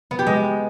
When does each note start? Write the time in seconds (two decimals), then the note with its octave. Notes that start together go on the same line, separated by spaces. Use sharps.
0.11 B3
0.19 G4
0.27 G#3